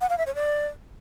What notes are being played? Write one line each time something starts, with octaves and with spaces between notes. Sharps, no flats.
F#5
F5
E5
C#5
D5